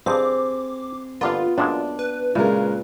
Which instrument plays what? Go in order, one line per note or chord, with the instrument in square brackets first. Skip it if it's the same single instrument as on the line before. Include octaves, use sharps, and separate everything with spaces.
[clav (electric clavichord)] G2 F3 D#5 [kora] C4 [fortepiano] G#4 [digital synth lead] D6
[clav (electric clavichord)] G1 D3 A#3 [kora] B3 F5 [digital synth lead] F4
[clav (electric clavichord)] F#2 A#2 G#3 [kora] D4
[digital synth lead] B4
[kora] A#2 [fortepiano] C#3 G#3 A#4 [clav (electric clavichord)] E4